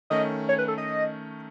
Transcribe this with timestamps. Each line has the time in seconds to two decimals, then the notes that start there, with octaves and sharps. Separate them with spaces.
0.10 D#3 A3 C#4 D#5
0.49 C#5
0.59 B4
0.68 A4
0.78 D#5